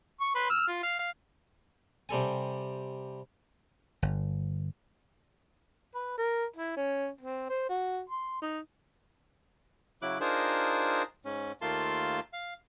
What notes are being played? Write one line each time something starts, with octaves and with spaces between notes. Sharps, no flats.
C#6
B4 C6
E6 F6
F4
F5
F5
C3 G3 A4 G#5
G1
B4
A#4
E4
C#4
C4
C5
F#4
C6
D#4
C#3 F#3 E4 D6 F#6
D4 D#4 F4 G#4 A#4 C5
G#2 C#4
D#2 A3 A#3 F4 A5 C6
F5